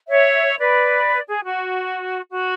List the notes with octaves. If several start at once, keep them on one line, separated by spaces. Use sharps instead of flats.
C#5 E5
B4 D5
G#4
F#4
F#4